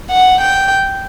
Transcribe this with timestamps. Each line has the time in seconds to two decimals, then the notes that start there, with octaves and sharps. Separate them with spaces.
0.10 F#5
0.41 G5